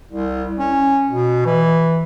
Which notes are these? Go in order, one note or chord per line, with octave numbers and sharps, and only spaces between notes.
C2
C#4
B2
E3